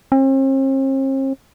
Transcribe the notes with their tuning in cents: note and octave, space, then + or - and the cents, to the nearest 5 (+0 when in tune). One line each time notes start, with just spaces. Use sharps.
C4 +45